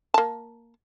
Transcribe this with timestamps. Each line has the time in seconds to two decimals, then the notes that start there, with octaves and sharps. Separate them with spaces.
0.14 A#3 A5